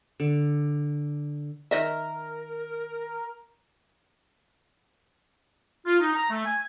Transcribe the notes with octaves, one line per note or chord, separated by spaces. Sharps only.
D3
D#3 A#4 D#5 E5
F4
D#4
A#5
A3
G#5